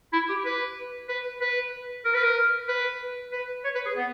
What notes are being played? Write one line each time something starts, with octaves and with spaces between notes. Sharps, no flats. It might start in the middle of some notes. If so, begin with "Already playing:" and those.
E4
G4
B4
B4
B4
A#4
B4
A#4
B4
B4
C#5
B4
G#4
B3